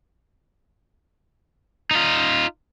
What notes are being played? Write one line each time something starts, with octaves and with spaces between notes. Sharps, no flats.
D#4 F4